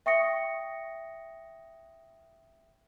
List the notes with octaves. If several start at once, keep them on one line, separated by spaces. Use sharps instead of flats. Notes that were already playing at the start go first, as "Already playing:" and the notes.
E5 G5 C#6 D#6 A#6 C#7